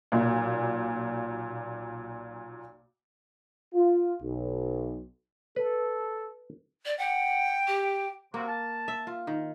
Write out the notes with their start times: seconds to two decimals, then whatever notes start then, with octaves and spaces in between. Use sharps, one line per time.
0.12 B1 A#2
3.74 F4
4.21 B1
5.56 A4 B4
6.85 D5
6.99 F#5 G5
7.67 G4
8.34 C3 A#3 F#4
8.47 A5
8.88 E5
9.07 F4
9.27 D#3